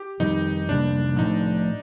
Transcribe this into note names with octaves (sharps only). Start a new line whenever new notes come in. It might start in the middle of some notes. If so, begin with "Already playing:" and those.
Already playing: G4
F2 D#3 G3 C4 D#4
F2 C3 G3 A#3 D4
A2 F3 A3 C4 D#4